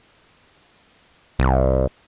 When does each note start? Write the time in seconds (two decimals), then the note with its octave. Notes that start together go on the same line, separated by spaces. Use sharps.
1.39 C2